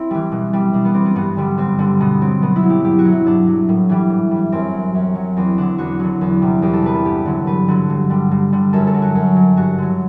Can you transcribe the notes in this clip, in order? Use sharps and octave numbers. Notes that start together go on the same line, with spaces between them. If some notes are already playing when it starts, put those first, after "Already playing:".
Already playing: C4 E4
E3 G3
B2
G3
B2 D4
B3
G3 C4
B3
G2 B3
D3 G3
G2 C4
D3
G3
B2 B3
F#3 C4
B2 B3
E4
F#3
G4
G2 G4
F#4
F#3
E4
G2 D4
F#3
A2
E3 G3
A2
E3 G3
F#2 C4
F#3
F#2
F#3
E2 C4
D3 F#3 D4
E2 F#4
D3 F#3
E2
C3 G3
E2 G4
A4
C3 G3 B4
A4
G2 G4
D3 F#3
G2 B4
D3 F#3
G2
D3 G3
G2
D3 G3
F#2 A4
A4
F#3
F#4
F#2
F#3
G2 F#4
D3 F#3